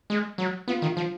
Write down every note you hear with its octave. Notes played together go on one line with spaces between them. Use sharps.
G#3
F#3
B3 F4
D#3
F4
F3